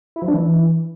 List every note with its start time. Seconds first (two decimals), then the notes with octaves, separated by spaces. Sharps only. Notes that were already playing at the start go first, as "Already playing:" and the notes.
0.16 E4
0.22 F3
0.28 D4
0.34 E3